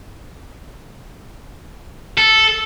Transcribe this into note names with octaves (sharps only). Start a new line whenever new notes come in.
A4